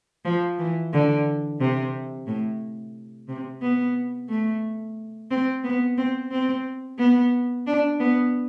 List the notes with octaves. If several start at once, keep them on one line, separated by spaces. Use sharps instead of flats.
F3
E3
D3
C3
A2
C3
B3
A3
C4
B3
C4
C4
B3
D4
B3